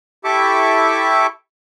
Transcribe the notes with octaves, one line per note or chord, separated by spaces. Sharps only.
E4 G4 A4 E5 C#6 D6